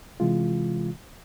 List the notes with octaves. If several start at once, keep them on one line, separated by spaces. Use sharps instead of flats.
C3 E3 G#3 F4